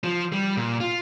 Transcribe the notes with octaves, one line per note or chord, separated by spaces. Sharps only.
F3
G3
A#2
F4